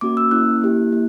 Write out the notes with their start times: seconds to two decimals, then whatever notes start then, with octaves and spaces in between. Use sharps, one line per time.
0.01 A#3 C#4 F#4 D6
0.17 E6
0.31 A#3 C#4 E4 F#6
0.62 A#3 E4 G4
0.92 A#3 E4